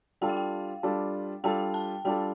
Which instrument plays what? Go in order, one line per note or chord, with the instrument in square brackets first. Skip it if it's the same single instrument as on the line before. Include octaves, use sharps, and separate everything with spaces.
[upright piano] G3 D4 F4 A4 [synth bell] G5
[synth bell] F5
G5
[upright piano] G3 D4 F4 A4
[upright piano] G3 D4 F4 A4 [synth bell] G5
[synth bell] A5
[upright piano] G3 D4 F4 A4 [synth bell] G5